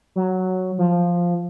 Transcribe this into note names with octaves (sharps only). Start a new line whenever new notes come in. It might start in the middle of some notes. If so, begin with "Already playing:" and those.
F#3
F3